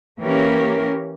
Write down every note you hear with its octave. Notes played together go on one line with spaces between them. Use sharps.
E3 A#3 C#4 G4 A#4